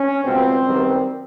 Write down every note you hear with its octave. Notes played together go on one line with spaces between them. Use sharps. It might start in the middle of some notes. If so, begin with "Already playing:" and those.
Already playing: C#4
C#2 B2 G3 C4
F#2 D#3 G3 B3